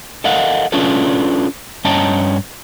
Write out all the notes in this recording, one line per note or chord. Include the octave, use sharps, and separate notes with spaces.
A4 A#4 D#5 F5 F#5
C#4 D4 F4 G#4 A4 B4
G2 C#4 D#5 G5 A5 A#5